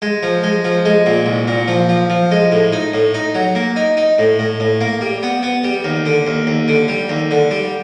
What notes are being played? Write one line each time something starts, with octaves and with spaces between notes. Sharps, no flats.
G#3
F3
G#3
F3
G#3
A#2
C2
A#2
F3
F3
F3
G#3
A2
D#4
A2
D#4
F#3
A#3
D#4
D#4
A2
A2
A2
A#3
G3
B3
B3
G3
D#2
D3
D#2
D#2
D3
G3
D#2
D3
G3